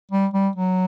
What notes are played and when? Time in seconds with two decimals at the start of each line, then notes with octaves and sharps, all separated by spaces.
0.12 G3
0.34 G3
0.56 F#3